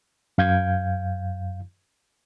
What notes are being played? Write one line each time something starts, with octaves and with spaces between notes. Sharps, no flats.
F#2 F5 G6 G#6